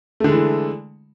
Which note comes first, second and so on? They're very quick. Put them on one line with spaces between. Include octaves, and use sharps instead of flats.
A3 D3 G#3 E3